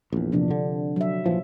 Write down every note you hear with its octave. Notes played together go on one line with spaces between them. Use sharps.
A#1 E2
C3 F3 D4
D3
F#3 E5
A#1 E3 F3